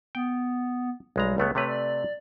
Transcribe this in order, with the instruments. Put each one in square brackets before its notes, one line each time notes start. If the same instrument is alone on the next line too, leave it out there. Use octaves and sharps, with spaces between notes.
[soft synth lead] B3 [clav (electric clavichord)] G5
[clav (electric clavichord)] B1 G#3 A#5 [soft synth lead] G3
[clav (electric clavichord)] C#2 A3 B3
[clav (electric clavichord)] C3 A3 B4 [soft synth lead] C#5
[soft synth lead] D5